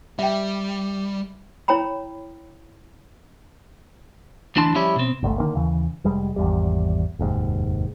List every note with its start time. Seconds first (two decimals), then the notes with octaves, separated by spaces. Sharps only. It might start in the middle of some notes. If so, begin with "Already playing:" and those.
0.19 G3 E5 G5
1.68 E4 C#5 G5 A#5 B5
4.56 D2 E3 D4 E4 A5 C6
4.74 F3 G3 C#4 E4 G4 C#5
4.96 B2 C4
5.23 G1 C#2 C3 A3
5.38 D3 D#3 A#3
5.55 D#2 C#3 E3
6.04 F1 G3 G#3
6.36 G#1 E2 G3
7.19 F1 D#2 G#2